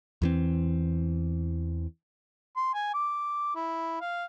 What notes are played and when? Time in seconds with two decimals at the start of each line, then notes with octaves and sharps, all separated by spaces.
0.22 E2 E3 C4
2.57 C6
2.75 G#5
2.94 D6
3.56 E4
4.01 F5